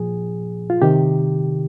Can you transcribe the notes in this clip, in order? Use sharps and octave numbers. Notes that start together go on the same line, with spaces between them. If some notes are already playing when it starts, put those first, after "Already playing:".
Already playing: A#2 F3 G#4
F4
C3 D#3 G4